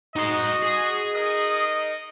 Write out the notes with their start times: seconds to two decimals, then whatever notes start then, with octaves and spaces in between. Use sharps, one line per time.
0.16 D#4 F#4 D#5 C6
0.62 G#4
1.14 D#4 A#4 D#5